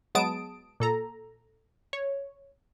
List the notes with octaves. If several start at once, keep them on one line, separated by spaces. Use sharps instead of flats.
F#3 G#3 B3 A5 D#6 D7
A#2 A4 A#5
C#5